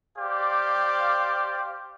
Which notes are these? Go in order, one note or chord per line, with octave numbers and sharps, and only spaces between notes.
G4 C5 D5 F5